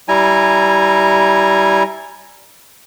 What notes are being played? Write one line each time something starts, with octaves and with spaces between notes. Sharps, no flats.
G3 E4 G#5 A#5